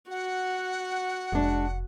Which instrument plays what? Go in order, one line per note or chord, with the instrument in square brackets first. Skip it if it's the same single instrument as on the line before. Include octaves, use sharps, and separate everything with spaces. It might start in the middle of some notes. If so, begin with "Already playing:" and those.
[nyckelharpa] F#4 [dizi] F#5
[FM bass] F1 [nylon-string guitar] G#3 D4